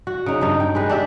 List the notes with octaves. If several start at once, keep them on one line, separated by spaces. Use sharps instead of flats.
F#4
C#3 D#4
G2 D#4
G5
G#3 G4 B4
D4 G4 E5